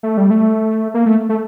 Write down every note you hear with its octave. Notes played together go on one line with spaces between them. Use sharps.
A3
G3
A3
A#3
A3
A3